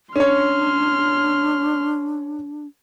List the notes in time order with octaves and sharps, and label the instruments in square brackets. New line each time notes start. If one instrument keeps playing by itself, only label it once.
[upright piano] C#4 C#5 [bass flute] D4 [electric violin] C6 F6